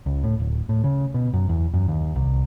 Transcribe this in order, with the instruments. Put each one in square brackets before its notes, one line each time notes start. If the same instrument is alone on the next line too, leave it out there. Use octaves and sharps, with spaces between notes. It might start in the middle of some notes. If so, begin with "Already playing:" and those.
[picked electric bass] C#2
A2
D1
A2
C#3
B2
F#2
E2
F#2
D#2
C2